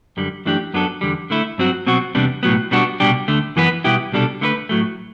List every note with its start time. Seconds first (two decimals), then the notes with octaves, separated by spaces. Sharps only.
0.17 F#2 D3 G3
0.45 F#2 E3 A3 D4 G4
0.74 F#2 F#3 B3 D4 A4
1.01 E2 D3 G3
1.30 D3 A3 E4
1.58 G2 F#3 C4 F#4
1.87 B2 F#3 C4 F#4
2.15 E2 C3 G3 B3 D4
2.43 B1 A2 F#3 B3
2.71 B2 G3 B3 D4 F#4
3.00 C2 B2 G3 D4 G4
3.28 D2 D3 A3
3.56 F#2 E3 B3 E4 B4
3.84 B2 G3 B3 E4 G4
4.12 C2 B2 G3 D4 A4
4.41 D3 A3 E4 B4
4.69 A2 F#3 A3